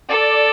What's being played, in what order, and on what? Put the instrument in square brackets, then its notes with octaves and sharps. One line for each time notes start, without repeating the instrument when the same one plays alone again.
[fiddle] A4 [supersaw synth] D5